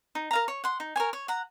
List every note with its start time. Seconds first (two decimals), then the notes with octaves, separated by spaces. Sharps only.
0.15 D#4
0.31 A#4 F5 A#5
0.48 C#5
0.64 F#5 C6
0.80 D#4
0.96 A#4 C#5 G#5
1.13 C#5
1.28 F#5 A#5